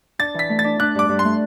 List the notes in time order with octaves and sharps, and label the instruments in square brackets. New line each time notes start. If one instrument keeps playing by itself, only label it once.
[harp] D4 [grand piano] A6
[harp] E3 [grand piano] B6
[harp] A3
[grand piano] A6
[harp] D4
[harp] D4 [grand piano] F#6
[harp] G2 [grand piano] D6
[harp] G2
[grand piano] C6
[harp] A3